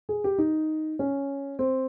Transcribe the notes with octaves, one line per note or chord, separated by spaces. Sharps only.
G#4
G4
D#4
C#4
C4